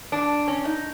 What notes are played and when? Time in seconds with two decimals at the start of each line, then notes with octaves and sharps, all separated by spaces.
0.12 D4
0.48 C#4
0.65 D#4